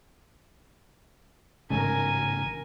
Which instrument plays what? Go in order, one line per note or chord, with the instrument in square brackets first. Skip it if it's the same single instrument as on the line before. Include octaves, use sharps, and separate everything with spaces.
[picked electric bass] A1 G#2 C#3 [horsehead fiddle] A#4 G#5